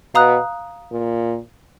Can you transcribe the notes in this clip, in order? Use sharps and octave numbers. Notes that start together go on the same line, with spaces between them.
B2 F5 A#5 D#6 F#6
A#2